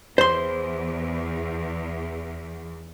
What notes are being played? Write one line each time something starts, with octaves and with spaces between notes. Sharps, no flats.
E2 C5 C6